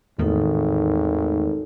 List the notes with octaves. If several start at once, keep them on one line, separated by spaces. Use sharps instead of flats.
G#1 E2 A2 D#3 D#4 A4